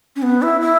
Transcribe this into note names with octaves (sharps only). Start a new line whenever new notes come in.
C#4
B3
E4
E4